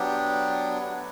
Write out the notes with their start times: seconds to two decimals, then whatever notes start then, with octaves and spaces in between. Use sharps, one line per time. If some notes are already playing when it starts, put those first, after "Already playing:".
Already playing: F#3 B3 D4 G4
0.81 A3 D4 F#4 B4 C#5